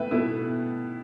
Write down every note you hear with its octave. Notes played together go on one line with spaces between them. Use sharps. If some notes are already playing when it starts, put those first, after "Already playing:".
Already playing: B2 A3 E4 B4 E5 G5
B2 A3 E4